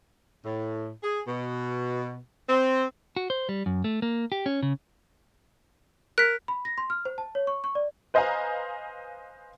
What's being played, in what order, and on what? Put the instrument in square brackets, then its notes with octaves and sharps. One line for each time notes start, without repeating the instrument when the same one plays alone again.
[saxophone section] A2
G#4
B2
C4
[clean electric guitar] F#4
C5
G3
F#2
A3
A#3
G4
C#4
C#3
[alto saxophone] A#4 [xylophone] F#6 B6
[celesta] B5
A#6
C6
F6
C5
A5
C#5
C#6
C#6
D5
[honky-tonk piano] B4 C5 D#5 F5 G#5 A#5